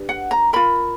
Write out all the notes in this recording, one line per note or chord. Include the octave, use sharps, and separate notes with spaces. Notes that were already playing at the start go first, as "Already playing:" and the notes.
Already playing: D4 G4 B4
F#5
A#5
F4 A#4 B5